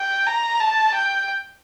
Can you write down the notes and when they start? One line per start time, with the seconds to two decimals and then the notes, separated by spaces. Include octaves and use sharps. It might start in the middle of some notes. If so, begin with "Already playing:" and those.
Already playing: G5
0.27 A#5
0.60 A5
0.94 G5